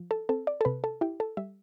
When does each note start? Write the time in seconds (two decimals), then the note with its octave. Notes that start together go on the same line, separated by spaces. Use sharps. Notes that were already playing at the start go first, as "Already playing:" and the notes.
Already playing: F3
0.11 A4
0.29 C4 A4
0.47 D5
0.61 A4
0.65 C3 B4
0.84 A4
1.01 E4 G4
1.20 A4
1.37 G3 E5